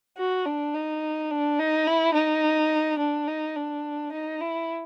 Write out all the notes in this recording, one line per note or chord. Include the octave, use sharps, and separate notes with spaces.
F#4
D4
D#4
D4
D#4
E4
D#4
D4
D#4
D4
D#4
E4